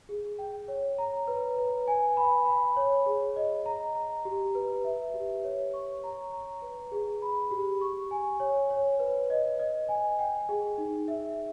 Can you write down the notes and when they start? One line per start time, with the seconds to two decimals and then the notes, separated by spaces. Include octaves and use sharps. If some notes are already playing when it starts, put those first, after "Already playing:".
0.09 G#4
0.39 G5
0.68 C#5
0.98 A#5
1.28 B4
1.58 B4
1.87 G#5
2.17 B5
2.46 B5
2.76 C#5
3.06 G#4
3.36 D#5
3.66 A#5
3.95 A#5
4.25 G4
4.55 B4
4.84 E5
5.14 G4
5.44 C#5
5.74 C#6
6.04 A#5
6.33 A#5
6.62 B4
6.92 G#4
7.22 B5
7.51 G4
7.81 C#6
8.11 G#5
8.40 C#5
8.70 C#5
8.99 B4
9.30 D#5
9.59 D#5
9.89 G#5
10.19 G5
10.49 G#4
10.78 D#4
11.08 E5